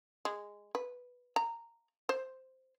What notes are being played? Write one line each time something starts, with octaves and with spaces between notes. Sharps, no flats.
G#3
B4
A#5
C5